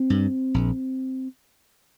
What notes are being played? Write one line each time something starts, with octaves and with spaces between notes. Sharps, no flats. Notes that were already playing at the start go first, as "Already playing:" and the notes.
Already playing: C4
G2
A#1